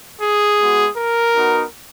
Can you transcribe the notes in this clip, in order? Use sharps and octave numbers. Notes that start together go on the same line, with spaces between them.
G#4
G#3 B3 F#4
A#4
B3 D#4 F#4